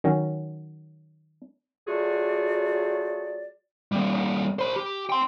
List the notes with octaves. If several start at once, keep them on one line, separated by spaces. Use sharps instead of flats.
D#3 F#3 C#4
F#3 A3 F4 F#4 G#4 D5
G3 A#3
C5 B5
G4
G5 C6